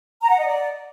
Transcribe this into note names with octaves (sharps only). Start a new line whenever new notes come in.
A#5
F#5
D#5
D5